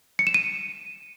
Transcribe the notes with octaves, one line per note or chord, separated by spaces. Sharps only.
C#7
E7
D#7